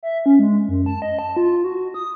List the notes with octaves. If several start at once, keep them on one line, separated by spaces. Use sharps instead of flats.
E5
C#4
G#3
F#2
A5
D#5
A5
F4
F#4
D#6